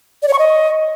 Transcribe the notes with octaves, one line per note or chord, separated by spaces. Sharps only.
D5
C#5
C#6
D#5